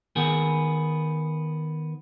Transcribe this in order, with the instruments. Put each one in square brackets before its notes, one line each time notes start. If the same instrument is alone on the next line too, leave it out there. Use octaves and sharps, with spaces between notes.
[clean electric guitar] D#3 B3 G#4